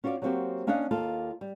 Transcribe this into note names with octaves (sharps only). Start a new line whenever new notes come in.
C#4 F4 F#4 C5 D5
F#3 G3 A#3 C4 F#4 G4
A#3 C#4 D4 D#5 F5 F#5
D#2 A#3 F4 A4
G3